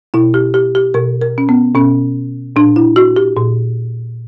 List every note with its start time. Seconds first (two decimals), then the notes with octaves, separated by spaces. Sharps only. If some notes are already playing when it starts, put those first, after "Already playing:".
0.14 B2 E4
0.34 G4
0.54 G4
0.75 G4
0.94 B2 A#4
1.22 A#4
1.38 C#4
1.49 B3
1.75 B2 C#4
2.56 A#2 D4
2.76 E4
2.96 F#4
3.16 G4
3.36 A#2